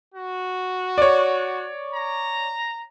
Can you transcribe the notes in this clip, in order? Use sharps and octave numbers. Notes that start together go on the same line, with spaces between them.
F#4
C#5 D5
A#5